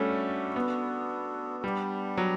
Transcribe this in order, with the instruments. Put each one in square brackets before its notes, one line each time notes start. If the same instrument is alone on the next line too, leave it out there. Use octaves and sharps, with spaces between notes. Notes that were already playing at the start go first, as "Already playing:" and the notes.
Already playing: [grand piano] G3 A3 C#4 [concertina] D4 F#4 A4
[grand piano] B3
[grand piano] G3 [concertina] B3 D4 G4
[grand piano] F#3